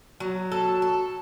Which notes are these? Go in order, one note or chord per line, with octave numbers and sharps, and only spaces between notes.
F#3
A4
A4